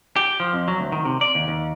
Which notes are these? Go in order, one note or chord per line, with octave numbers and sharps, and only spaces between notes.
G4
F3
F2
F#3
D2
D#3
C3
D5
D#2
D#2